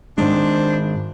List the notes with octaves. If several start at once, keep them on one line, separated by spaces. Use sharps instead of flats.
G#2 D#3 G#3 D4 C5